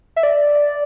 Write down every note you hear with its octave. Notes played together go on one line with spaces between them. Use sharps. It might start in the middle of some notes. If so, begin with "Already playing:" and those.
E5
D5